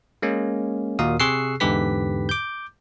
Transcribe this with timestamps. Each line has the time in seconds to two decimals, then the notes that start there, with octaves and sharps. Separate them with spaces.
0.22 G#3 A#3 C#4
0.99 D#2 A#2 A#3 F#4 F5 D#6
1.20 C3 G#4 C#6 E6 F#6 C7
1.60 E2 G#2 D3 G4 B4 B6
2.29 D6 G6